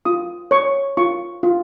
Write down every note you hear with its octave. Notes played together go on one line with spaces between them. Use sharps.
F4 D#6
C#5 C#6
F4 C#6
F4